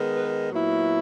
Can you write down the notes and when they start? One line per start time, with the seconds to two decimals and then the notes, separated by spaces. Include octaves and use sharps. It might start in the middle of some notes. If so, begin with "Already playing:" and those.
Already playing: D#3 G#3 B3
0.17 B4
0.51 A#2 F#3 B3 E4